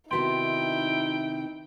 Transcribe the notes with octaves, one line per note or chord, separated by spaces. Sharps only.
C3 D#3 B3 D#4 E4 F#4 G5 C6